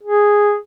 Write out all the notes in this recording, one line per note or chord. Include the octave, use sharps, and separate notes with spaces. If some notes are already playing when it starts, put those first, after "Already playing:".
G#4